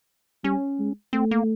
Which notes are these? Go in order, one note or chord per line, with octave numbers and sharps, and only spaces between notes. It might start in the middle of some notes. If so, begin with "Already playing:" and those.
G3 C#4
G#3
A3 C4
A#3